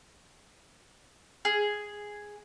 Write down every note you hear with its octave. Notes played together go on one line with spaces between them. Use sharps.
G#4